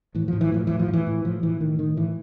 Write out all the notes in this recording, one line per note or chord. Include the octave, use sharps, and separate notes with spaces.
A2 E3
A2 F3
E3
A2 F3
A2 E3
F3
A2
E3
A2
A2 F3
A2 E3
A2 D#3
A2 D#3
A2 E3